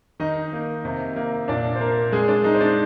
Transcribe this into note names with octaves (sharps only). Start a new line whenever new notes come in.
D#3 D#4 D#5
A#3
C3
A#3
A#2 D4 D5
C5
A#3 A#4
G#3 G#4
D4 D5
G#3 D#4 D#5
C5
D4 D5